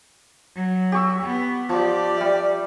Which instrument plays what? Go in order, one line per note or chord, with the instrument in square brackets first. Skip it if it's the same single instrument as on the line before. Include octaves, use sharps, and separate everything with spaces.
[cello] F#3
[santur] G4 C#6 E6
[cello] B3
[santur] F3 [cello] G4 D5
[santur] G3 E5